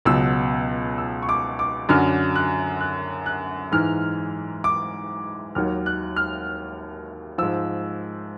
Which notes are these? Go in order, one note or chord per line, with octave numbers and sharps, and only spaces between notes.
C#2 B2 F#3 E6
E6
C#6
D6
D6
F#2 D3 F#3 F6
F#6
F#6
F#6
G#2 E3 F6
D6
D#2 D#3 F#3 F6
F#6
F6
G#2 F3 E6